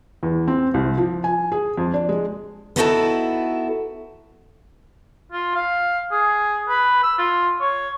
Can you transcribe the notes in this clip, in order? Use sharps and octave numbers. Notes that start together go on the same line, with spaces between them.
E2
C4
C2
F3
G#5
G#4
F2
D4
G#3
B3 D#4 E4 F#4 G4 A4
F4
F5
G#4
B4
E6
F4
C#5